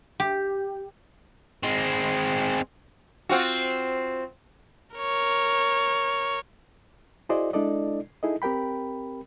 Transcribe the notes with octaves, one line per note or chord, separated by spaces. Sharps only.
G4
G#3 C4
C4 F4 F#4
A#4 C#5
E4 F#4 G#4 C5 D5 D#5
G#3 D4 E4 A4 D5 D#5
D#4 E4 G#4 A4 D#5
C4 G4 A#4 G5 B5